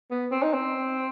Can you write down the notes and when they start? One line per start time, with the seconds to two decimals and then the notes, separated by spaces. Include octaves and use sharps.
0.11 B3
0.32 C4
0.43 D#4
0.53 C4